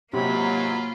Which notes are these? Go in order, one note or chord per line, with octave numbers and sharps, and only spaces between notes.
G#2 C3 F#3 A#3 F4 B5